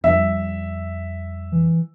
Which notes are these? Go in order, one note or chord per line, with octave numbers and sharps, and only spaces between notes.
F2 G3 E5
E3